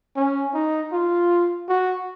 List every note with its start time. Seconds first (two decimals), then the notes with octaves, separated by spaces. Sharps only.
0.16 C#4
0.54 D#4
0.93 F4
1.69 F#4